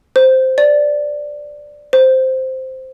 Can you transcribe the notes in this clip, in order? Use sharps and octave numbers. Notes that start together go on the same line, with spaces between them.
C5
D5
C5